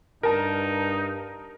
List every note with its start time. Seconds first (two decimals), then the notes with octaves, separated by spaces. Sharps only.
0.23 G2 D#4 A#4 A5